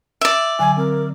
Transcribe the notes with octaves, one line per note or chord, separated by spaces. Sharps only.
D5 E5
D3 F#3 G#5
C4 A#4